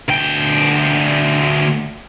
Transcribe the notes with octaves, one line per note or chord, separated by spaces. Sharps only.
D2 G5